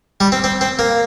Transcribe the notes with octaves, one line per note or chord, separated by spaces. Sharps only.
G3
C4
C4
C4
A#3